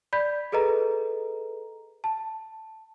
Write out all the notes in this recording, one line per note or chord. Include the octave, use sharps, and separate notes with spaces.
D5 B5 G6 B6
G#4 A4 B4 D#5 A#5
A5